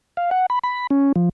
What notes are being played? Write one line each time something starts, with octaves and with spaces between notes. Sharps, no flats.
F5
F#5
B5
B5
C#4
F3